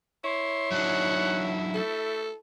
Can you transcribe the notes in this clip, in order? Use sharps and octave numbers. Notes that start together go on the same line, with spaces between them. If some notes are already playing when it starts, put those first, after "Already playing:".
E4 C#5 C6
F#3 D4 D#4 F#5
A3 A4